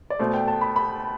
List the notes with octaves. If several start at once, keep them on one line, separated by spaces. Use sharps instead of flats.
D5
B2 A3 C5
G5
A5
B5
B5